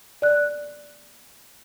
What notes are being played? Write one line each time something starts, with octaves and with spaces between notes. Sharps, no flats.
D5 F#6